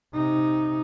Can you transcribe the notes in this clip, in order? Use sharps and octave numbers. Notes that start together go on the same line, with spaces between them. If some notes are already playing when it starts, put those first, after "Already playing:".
C3 D#4